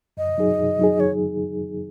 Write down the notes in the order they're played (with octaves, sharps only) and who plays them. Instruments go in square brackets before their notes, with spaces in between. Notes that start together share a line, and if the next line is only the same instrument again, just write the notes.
[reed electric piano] F#2 [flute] D#5
[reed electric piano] F#3 D#4 G#4
F#2
F#3 D#4 G#4
[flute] C#5